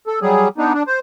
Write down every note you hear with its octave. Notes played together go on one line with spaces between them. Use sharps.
A4
F#3 G3 G#4
B3 D4 D#4
D4
C5